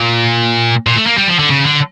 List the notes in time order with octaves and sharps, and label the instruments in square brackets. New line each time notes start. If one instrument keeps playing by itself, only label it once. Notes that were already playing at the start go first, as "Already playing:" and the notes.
Already playing: [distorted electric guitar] A#2
A#2
A3
A#3
G3
F3
D3
C#3
D3